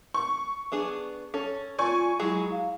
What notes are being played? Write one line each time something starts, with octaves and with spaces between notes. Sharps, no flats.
C#6
B3 D4 G#4
C#4 A4
F4 D5 G#5 C#6
F#3 G#3 E4 G#4
F5